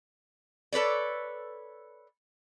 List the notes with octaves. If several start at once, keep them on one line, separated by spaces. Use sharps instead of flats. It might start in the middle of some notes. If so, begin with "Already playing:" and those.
A4 B4 C#5 D5